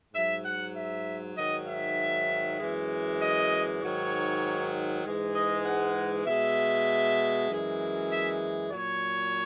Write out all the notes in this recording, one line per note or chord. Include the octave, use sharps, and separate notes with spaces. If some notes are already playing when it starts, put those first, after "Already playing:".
G#2 F#3 E5
F#5
E5
G#2 D#3 F#3 D#5
E5
F#2 E3 G#3
D#5
G#2 D#3 F#3 C#5
G#2 E3 G#3
D#5
F#5
B2 G#3 E5
F#2 E3 G#3
E5
A#2 F#3 C#5